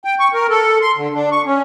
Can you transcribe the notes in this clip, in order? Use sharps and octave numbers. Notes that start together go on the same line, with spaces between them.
G5
C#6
A#4
A4
C6
D3
D4
C#6
C#4